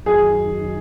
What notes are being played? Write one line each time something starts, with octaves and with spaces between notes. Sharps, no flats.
F#2 D#3 F#3 D#4 G#4